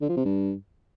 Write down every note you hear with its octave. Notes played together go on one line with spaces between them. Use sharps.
D3
F3
C3
G2